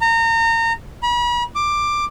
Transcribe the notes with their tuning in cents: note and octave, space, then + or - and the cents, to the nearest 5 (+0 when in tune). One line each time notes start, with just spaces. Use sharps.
A#5 -30
B5 -40
D6 +10